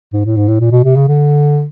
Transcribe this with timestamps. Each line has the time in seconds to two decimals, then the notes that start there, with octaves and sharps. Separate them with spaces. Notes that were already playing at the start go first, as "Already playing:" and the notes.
0.13 G#2
0.25 A2
0.36 G#2
0.48 A2
0.60 A#2
0.72 B2
0.84 C3
0.96 C#3
1.08 D3